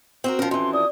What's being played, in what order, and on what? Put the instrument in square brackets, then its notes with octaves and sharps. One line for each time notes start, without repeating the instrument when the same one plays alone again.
[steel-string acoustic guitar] C4 F#4 A#4
[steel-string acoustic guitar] F3 A#4 [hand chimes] C#4 F#4
[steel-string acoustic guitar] F2 E3 [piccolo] C6
[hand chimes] D5 [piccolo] D#6